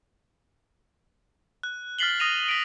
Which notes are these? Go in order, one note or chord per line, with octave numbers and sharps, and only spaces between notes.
F#6
F6 A6 B6 C7 F#7 G7
D#6 A#6 D#7 F7
B6 D7